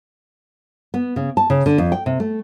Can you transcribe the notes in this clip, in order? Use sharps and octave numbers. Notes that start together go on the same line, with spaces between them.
B3
C#3
A5
C#3
D3
F2
G5
C3
A3